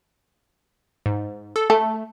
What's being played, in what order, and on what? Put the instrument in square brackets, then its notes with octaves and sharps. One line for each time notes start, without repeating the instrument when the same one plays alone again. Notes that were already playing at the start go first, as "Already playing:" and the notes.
[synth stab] G#2
A4
[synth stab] A3 [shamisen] A4